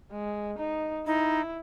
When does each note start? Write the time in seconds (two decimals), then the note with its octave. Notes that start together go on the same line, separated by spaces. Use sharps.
0.11 G#3
0.58 D#4
1.06 D#4 E4